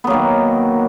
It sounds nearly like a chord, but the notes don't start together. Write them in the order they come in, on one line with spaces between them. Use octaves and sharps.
B3 F#3 A#3 D#3